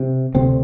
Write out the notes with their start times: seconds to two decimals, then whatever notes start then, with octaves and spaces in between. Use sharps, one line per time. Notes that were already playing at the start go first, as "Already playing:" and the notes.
Already playing: C3
0.35 D2 C3 C4